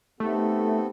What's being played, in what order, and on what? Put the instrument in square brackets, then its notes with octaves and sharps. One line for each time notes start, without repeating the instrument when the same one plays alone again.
[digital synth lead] A3 [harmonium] B3 C4 A4 [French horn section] D#4 G4